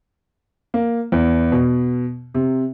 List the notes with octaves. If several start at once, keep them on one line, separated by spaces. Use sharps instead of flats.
A#3
E2
B2
C3